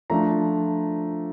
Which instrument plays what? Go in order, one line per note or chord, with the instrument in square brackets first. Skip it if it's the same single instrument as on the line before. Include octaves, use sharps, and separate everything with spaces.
[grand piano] F3 A3 D4 F4 A#5